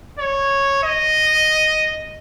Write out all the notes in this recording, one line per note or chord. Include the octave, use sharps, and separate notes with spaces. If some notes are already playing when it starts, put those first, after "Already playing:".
C#5
D#5